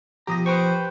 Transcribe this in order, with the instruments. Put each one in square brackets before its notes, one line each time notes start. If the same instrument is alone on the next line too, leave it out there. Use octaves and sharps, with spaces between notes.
[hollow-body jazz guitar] B2 F3 A#5 [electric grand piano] G4 D#6 A#6
[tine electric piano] B4 G5 C#6 [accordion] C5